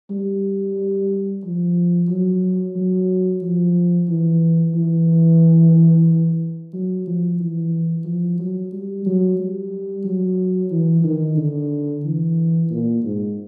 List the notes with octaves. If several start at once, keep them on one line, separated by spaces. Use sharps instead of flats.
G3
F3
F#3
F#3
F3
E3
E3
F#3
F3
E3
F3
F#3
G3
F#3
G3
F#3
E3
D#3
D3
E3
A#2
G#2